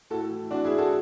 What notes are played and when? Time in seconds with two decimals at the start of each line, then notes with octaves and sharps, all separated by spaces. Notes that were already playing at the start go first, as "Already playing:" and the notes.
0.10 A2 F#4 A4
0.31 E3
0.51 E3 D4 F#4
0.64 E4 G#4
0.71 A2
0.78 F#4 A4